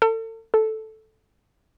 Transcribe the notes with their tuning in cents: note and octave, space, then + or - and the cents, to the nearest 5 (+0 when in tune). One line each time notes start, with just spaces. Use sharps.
A4 +35
A4 -5